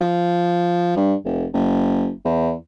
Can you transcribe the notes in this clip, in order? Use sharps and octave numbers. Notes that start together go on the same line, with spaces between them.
F3
G2
F1
F#1
E2